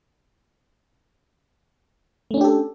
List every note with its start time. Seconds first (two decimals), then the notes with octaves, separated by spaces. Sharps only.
2.31 A3
2.34 C#4
2.37 D4
2.41 G4
2.44 A4